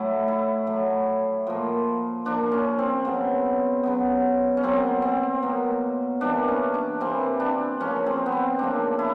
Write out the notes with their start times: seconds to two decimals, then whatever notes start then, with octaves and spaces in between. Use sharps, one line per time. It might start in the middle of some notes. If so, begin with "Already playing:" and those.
Already playing: A2 F#3 A3 E4
0.28 E4
0.67 A2 F#3 A3
1.47 A#2 F3 A#3
2.25 A#2 F3 A#3 D4
2.52 C#4
2.79 C4
3.05 C#3 F#3 B3
3.83 C#3 F#3 B3
4.57 C#4
4.63 B2 F#3 A#3 C4
5.02 C4
5.42 B2 F#3 A#3
6.21 C3 E3 G3 A#3 D4
6.48 C#4
6.74 D4
7.00 C3 E3 G3 A#3 C4
7.40 D4
7.80 C#3 F3 A#3 C#4
8.06 C4
8.26 B3
8.32 C4
8.59 C#3 F3 A#3 D4
8.99 E4